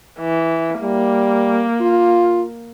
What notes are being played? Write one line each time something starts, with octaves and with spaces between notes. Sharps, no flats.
E3
G3 A#3
F4